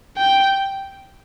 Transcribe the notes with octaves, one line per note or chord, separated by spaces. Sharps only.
G5